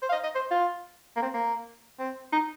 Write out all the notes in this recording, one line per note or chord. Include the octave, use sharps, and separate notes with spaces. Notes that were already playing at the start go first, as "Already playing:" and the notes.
C5
F5
D#5
D#5
C5
F4
A#3
C4
A#3
C4
D#4